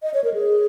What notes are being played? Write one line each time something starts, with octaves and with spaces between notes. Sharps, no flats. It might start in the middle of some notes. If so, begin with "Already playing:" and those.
D#5
C#5
A#4
G#4